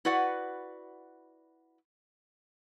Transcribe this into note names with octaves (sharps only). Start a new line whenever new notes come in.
E4 F#4 B4 D5 F#5